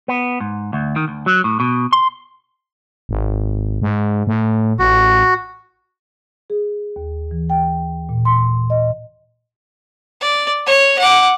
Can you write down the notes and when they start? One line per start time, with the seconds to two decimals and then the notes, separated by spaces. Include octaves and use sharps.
0.08 B3
0.40 G#2
0.73 D2
0.96 D#3
1.08 D2
1.26 F#3
1.44 A2
1.60 B2
1.92 C6
3.09 G#1
3.82 G#2
4.27 A2
4.79 A1 F#4
6.50 G#4
6.96 D#2
7.31 E3
7.50 G5
8.09 A#2
8.25 C6
8.70 D#5
10.21 D5
10.66 C#5
10.99 F#5 D6